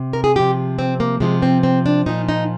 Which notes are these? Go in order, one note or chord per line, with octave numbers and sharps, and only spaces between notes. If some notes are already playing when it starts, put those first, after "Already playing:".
Already playing: C3
A#4
G#4
C3 F3 G4
C4
A#3
C3 F3 G#3
C4
C4
D4
A#2 F3 D#4
D#4